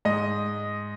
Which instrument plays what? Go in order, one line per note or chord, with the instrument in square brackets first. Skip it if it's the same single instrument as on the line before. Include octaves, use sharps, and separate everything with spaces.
[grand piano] G#2 D#5